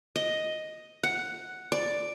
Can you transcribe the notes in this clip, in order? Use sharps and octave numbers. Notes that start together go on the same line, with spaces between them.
D#5
F#5
D5